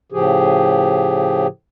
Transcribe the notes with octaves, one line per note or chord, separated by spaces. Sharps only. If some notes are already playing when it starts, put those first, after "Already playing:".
A2 C#3 F3 G4 G#4